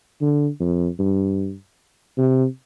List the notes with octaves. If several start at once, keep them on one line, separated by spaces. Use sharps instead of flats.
D3
F2
G2
C3